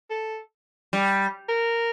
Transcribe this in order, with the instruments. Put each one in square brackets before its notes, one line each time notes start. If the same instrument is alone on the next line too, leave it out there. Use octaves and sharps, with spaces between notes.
[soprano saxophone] A4
[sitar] G3
[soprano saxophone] A#4